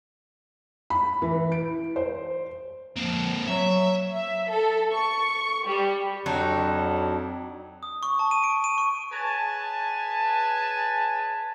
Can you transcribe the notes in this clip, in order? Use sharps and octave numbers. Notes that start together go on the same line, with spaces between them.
B5
E3
D7
C5
F3 A#3 C4
F#3 C#5 E5
E5
A4
C#6
G3
F2 F#3 D4 D#4
D#6
C#6
A5
D#7
D7
D#7
C#6
G#4 B4 C#5 G#5 A5